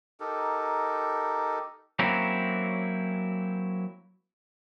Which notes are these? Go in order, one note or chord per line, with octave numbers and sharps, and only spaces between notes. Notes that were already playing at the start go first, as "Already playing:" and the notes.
D#4 G4 A4 A#4
F#3 A#3 C4 C#4 E4